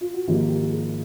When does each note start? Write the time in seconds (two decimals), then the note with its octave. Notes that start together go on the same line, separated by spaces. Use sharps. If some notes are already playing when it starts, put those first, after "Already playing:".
0.01 F4
0.14 F#4
0.28 G#1 G#2 F3 A#3 G4
0.49 G4
0.71 G#4